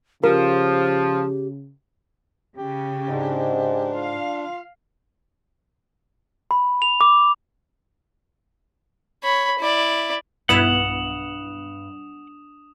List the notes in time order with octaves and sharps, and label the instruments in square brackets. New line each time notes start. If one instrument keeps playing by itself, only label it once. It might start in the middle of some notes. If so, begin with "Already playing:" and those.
[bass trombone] C#3 [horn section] F3 [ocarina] G4 [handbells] A#4
[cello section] C#3 [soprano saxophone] G4
[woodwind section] G#2 [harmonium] D4
[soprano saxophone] F4 [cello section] F5
[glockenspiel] B5
F7
D6
[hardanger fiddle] C#5 B5
E4 D5
[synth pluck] B1 B3 E4 [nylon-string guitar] G2 [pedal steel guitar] F#5 [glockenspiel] D#6 E7 F7